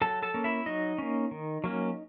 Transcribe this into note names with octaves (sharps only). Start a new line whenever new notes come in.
F#3 A4 A5
A4 A5
A#3 C#4
E4 E5
F#3 D#4 D#5
A#3 C#4
D#3
F#3 A#3 C#4